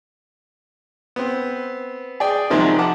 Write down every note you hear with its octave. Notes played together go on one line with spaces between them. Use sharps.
B3 C4
G#4 D5 G5
C3 D#3 F3 F#3 G#3
F#5 A5 D6